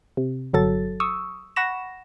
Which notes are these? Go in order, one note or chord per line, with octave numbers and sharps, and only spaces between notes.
C3
G1 F#3 A4 A6
C#6 D#6 E6
F#5 B5 C#6 A#6 E7